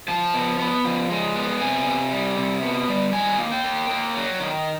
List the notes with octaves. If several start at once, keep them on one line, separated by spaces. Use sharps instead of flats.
F3 A5
B3
B3
F3
G#3
B3
C3 G#5
C3
G3
C3
B3
G3
D#3 G#5
A#3
G5
A#3
A#3
F#3
D#3